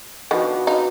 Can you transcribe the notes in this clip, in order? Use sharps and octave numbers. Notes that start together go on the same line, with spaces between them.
D#3 F3 B3 D4 F#4
D#4 F4